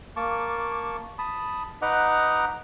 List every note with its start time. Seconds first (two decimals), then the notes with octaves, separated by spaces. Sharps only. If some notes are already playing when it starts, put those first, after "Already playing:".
0.16 A#3 A5 C#6 D6
1.19 A5 B5 D#6
1.82 D#4 B4 D#5 F#5 A#5 D6